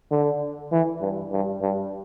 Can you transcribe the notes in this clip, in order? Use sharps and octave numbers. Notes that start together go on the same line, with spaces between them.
D3
E3
G2
G2
G2